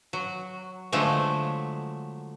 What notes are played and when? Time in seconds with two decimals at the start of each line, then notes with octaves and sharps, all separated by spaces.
0.13 F#3
0.92 D3 F3 F#3 G#3 A3